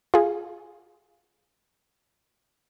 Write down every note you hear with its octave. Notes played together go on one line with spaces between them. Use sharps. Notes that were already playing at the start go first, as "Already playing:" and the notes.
F4 G#4